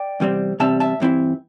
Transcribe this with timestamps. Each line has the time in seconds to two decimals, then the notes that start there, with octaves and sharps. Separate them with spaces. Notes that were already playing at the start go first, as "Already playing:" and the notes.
Already playing: D5 G5
0.20 E2 C3 G3 C4
0.60 E2 C3 G3 C4 E5 A5
0.80 E5 A5
1.00 G2 E3 C4 E4